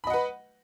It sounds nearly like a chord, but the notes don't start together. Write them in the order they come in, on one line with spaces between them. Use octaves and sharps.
B5 D#5 F#5 B4